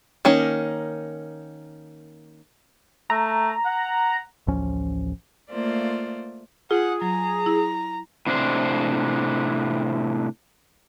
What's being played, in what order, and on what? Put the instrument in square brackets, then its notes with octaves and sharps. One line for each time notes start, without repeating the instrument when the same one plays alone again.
[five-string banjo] D#3 A#3 C#4
[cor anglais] A3 [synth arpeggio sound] A#5
[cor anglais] F#5
[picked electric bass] A1 D2 F3 C#4
[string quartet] A3 A#3 F4 C5 D5
[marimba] F4 [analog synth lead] G#4 [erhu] F#5
[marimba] F#3 [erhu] A#5
[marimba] E4
[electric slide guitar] A2 C3 D4 C5